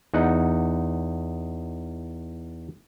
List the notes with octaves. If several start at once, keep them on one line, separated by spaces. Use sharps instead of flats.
E2 D#4 F#5